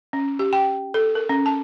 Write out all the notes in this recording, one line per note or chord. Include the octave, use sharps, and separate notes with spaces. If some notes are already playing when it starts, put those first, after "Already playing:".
C#4
G4
G5
A4
A#4
C#4
A5